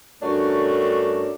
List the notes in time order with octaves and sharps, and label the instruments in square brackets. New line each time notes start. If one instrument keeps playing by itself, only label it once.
[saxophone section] G2 A3 C#4 D4 F#4 A#4